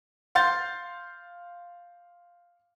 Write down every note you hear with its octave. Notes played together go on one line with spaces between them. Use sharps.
F5 C6 G6 A6